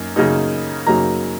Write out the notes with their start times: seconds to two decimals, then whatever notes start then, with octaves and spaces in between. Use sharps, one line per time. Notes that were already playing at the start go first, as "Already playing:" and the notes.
Already playing: F#2 A#3 D#4
0.16 F#2 C#3 F#3 A#3 D#4
0.87 F#2 C#3 F#3 A#3 D#4 A#5